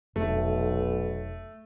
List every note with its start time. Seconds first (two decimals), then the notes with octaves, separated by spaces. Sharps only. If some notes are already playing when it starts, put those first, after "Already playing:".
0.16 F1 B1 A3